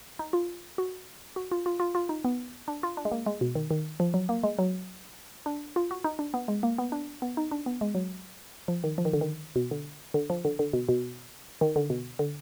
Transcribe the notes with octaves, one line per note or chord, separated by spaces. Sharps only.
D#4
F4
F#4
F#4
F4
F4
F4
F4
D#4
B3
D4
F4
D4
G#3
A#3
G#3
B2
D#3
D#3
F3
F#3
A#3
G#3
F#3
D4
F4
F#4
D#4
D4
B3
G#3
A#3
B3
D4
B3
D#4
D4
B3
G#3
F#3
F3
D#3
F3
D#3
D3
D#3
B2
D3
D3
F3
D3
D3
B2
B2
D#3
D3
B2
D3